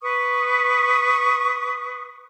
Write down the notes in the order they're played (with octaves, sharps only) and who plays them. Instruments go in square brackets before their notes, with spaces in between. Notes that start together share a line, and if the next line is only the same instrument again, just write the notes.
[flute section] B4 C#6 D#6